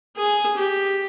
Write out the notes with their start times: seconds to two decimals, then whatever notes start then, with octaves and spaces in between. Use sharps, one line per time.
0.17 G#4
0.57 G4